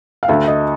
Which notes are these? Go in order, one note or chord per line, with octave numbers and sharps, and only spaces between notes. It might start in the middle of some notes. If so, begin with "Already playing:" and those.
F5
D2 E5
D#5